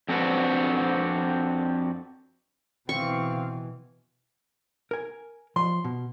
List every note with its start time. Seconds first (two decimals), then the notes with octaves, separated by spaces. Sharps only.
0.09 F2 C4 D4 F#4 B4
2.89 B2 E3 C4 F5 C#6
4.91 A#4 G#5
5.56 F3 C6
5.84 B2